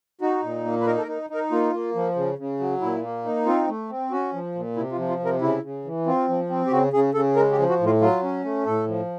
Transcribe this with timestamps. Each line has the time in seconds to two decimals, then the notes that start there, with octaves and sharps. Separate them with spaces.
0.21 D#4 F#4
0.43 A#2
0.65 A#3
0.81 B4
0.87 D#4 A#4
0.98 A4
1.02 A#4
1.08 D#4
1.30 D#4 A#4
1.51 A#3 F4
1.73 A#3
1.95 F3
2.16 C#3
2.38 C#3
2.60 F#3
2.81 A#2 E4
3.03 A#3
3.25 D#4
3.46 C4 F4
3.68 A3
3.90 C4
4.11 C#4 F#4
4.33 F3
4.55 A#2
4.76 C3 E4
4.92 F4
4.97 F3
5.09 F4
5.20 C3
5.25 A#4
5.41 C#3 E4
5.63 C#3
5.85 E3
6.06 C4 F4
6.28 F3
6.50 C4
6.67 G4
6.71 C#3 F#4
6.93 C#3 G#4
7.14 C#3 A4
7.36 G#3 A#4
7.52 G4
7.58 F3
7.69 F#4
7.80 A2
7.86 F4
8.01 F#3 F4
8.23 C#4
8.44 A3
8.66 A2 A4
8.88 F3